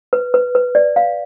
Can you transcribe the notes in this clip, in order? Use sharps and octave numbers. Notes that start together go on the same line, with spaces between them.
B4
B4
B4
D5
F5